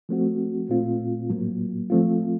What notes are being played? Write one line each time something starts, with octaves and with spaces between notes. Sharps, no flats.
F3 A3 C4 F#4
A#2 A3 C4 F4
A2 F#3 A#3
F3 A3 C4 F4